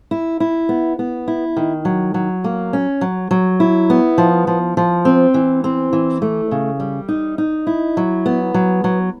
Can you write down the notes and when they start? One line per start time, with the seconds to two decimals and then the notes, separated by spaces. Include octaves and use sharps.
0.11 E4
0.40 E4
0.69 B3
0.99 B3
1.28 E4
1.56 D#3
1.85 F#3
2.14 F#3
2.44 A#3
2.73 C#4
3.01 F#3
3.31 F#3
3.60 E4
3.90 B3
4.18 F3
4.47 F3
4.77 F3
5.05 C4
5.34 E3
5.64 C4
5.93 E3
6.22 A3
6.51 C#3
6.80 G3
7.08 D#4
7.38 D#4
7.67 E4
7.97 F#3
8.26 B3
8.54 F#3
8.84 F#3